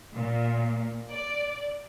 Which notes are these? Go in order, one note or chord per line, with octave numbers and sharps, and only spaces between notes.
A#2
D5